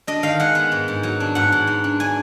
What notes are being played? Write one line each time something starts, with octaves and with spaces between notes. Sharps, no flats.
D4 D#5
D#3 F5
G#3 F#5
B3
G#2
G#2
F#3
D4
G#2 F#5
G#2
F#3
D4
D4 G#5